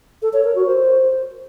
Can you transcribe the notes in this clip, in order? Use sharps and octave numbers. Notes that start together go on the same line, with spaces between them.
A4
C#5
A#4
F#4
C5